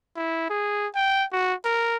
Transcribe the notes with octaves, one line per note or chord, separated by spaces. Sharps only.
E4
G#4
G5
F#4
A#4